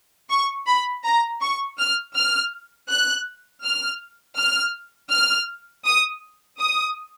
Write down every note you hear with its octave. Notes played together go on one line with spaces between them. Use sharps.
C#6
B5
A#5
C#6
F6
F6
F#6
F6
F6
F6
D#6
D#6